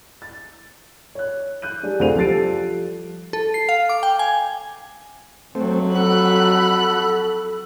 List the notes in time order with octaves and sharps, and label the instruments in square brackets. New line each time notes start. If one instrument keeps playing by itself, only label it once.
[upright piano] A6
C#5 F#6
F#6 G6 D#7
G3 D4 G#4
F1 D2 F4 C5 D#7 F7
F3 G3 A4 A6 C7 D7
[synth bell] A4
C7
F5
D6
G5
G#5
[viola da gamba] F2 F#3 [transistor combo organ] A3 C4
[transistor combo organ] F#4 [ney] A4 [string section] B5 F#6